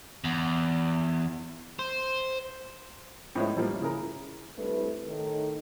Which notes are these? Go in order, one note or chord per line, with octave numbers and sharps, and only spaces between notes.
E2
C5
A2 F3 G#3 B3 C#4 E4
E3 F3 G3 A#3
C#3 E3 G#4 A#4
G3 A3 C4 D4 E4 B4
A2 D#3 D#4 A4